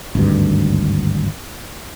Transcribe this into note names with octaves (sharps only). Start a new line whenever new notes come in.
G#1 D2 G2